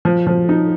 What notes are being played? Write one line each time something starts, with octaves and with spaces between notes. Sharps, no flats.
F3
F3
D#4